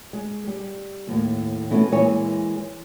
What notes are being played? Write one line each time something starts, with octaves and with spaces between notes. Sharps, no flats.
G#3
G3
D#2 A2
B2 E3 G#3 A3 C#4 E4
A#2 E3 G#3 E4 C#5 G#5